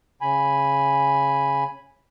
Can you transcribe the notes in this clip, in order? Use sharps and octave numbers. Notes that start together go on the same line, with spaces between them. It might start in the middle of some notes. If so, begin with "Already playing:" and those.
C#3 G#5 B5